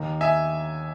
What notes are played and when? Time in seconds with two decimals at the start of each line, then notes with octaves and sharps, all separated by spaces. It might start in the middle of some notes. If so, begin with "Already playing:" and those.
Already playing: D#2 D#3
0.21 E5 G#5